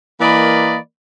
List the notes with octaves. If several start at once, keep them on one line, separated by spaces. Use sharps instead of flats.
E3 A#3 A#4 D5 D#5 B5